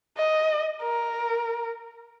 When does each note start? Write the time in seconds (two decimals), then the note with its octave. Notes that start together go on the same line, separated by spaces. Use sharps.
0.17 D#5
0.82 A#4